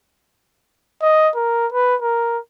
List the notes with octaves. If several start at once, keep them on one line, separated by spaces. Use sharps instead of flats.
D#5
A#4
B4
A#4